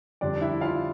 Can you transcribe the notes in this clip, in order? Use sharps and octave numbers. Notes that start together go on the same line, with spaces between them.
F2 D3 G3 D4 D5
E4 E5
F4 F5